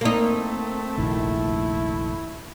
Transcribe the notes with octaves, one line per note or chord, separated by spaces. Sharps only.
A3 A#3 C4 D#4
F1 A#1 D#3 E4